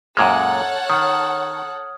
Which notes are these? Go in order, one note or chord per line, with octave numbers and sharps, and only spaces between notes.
F#2 A#2 G#3 A4 C#5 F#5 F6 G#6
D#3 D#6 F6